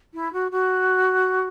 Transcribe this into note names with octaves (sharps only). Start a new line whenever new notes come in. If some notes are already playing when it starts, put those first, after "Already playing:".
E4
F#4
F#4